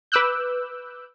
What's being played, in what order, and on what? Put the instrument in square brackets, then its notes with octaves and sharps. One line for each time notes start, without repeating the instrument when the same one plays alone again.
[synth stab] B4 D6 E6 F#6 G6